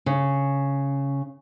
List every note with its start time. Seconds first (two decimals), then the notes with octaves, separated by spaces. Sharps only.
0.06 C#3